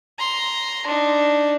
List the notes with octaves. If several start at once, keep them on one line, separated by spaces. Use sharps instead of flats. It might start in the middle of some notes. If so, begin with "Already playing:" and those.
A#5 C6
D4 D#4